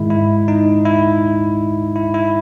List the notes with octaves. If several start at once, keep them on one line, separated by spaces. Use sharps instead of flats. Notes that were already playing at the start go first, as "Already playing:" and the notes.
Already playing: G#2 D#3 G#3 E4
E4
D#4
E4
E4
E4